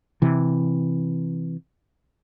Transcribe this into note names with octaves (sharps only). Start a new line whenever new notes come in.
C3 E3